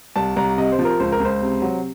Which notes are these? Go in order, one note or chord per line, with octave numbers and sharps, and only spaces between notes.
C2 A5
C2 A#5
C3 D#5
C5
F3
A#4
C#2 C5
A#4
C#2
C5
C3
F#3